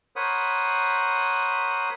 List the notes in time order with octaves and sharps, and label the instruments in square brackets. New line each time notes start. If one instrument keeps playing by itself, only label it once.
[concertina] A#4 C5 C#5 F#5 B5 D#6